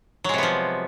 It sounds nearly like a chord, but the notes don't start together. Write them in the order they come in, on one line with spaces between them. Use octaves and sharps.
F#3 G#3 C3 B3 F3